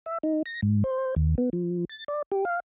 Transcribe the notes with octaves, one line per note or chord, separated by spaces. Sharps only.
E5
D#4
A#6
G#2
C5
D#2
B3
F3
A6
D5
G4
F5